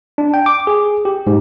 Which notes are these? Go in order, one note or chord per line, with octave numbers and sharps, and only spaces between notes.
D4
G5
D6
G#4
G4
G#2